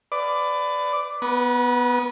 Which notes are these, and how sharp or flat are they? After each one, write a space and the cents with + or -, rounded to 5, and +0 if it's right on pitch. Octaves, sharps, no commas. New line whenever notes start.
B4 +25 D5 +0
B3 +0 B4 -40